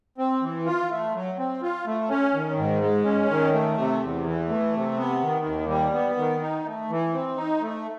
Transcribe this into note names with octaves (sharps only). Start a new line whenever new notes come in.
C4
E3
F4
A3
F#3
C4
F4
A3
C#4
D#3
G#2
G#3
C#4
D#3
A3
C3
E2
E3
A3
C3
B3
D#3
D#2
G3
B3
D#3
D#4
A3
E3
C4
D#4
A3